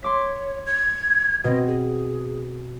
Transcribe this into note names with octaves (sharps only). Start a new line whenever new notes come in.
C#5 C6 D6 B6
G#6
B2 C4 D#5
G#4